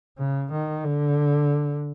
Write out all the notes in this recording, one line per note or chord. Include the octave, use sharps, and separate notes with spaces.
C#3
D#3
D3